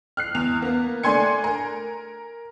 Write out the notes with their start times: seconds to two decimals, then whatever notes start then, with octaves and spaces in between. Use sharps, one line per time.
0.17 F6 F#6 C7
0.35 E2 F7
0.62 A#3 B3
1.03 A3 D4 G#5 C6 G#6 C#7
1.44 A#4